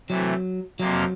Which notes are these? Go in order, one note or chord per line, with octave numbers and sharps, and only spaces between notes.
C3 E3 F#3 A3
F2 C3 F3 F#3 A#3